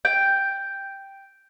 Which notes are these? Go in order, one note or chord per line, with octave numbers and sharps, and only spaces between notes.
G5